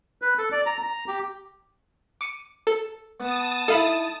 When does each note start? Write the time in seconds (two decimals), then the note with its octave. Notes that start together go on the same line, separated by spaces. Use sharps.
0.22 B4
0.38 A4
0.52 D5
0.66 A#5
0.82 A#5
1.08 G4
2.21 D6 C#7 D#7
2.67 A4
3.20 B3 A5 D#6
3.68 D#4 E4 A4 F5 B5